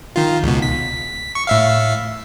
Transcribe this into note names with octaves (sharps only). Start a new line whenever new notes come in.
D#3 F4
C#2 B2
B6
C#6
A2 E5 F5